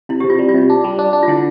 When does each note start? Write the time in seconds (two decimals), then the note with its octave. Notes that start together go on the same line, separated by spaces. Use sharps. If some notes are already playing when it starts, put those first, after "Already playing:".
0.09 C3 E4
0.20 G4
0.24 C3
0.30 F4
0.39 G3
0.49 F4
0.54 C3
0.70 D4
0.84 G3
0.99 D4
1.13 D4
1.23 F4
1.28 D3 E4